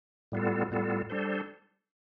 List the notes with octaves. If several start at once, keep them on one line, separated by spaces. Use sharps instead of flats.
A2 G3 B3 F4 A4
A2 G3 B3 F4 A4
G3 D4 A4 C5